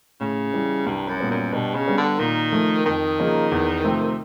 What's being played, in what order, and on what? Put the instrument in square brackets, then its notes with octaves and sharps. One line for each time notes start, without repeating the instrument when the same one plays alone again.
[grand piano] A2 [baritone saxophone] C#3
[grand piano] E3 G3
[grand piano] C2 [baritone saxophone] G2
[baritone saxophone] F#2
[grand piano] A#2 G3 B3
[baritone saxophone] F#2
[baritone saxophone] G2 [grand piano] B2
[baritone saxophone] C#3
[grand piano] G3 B3 D4 F#4
[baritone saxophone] D3
[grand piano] A#2 [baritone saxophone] D#3
[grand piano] F3 A3
[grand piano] F2 [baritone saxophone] D#3
[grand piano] C#3 F3 A#3 D#4
E2
C3 F3 A3 C4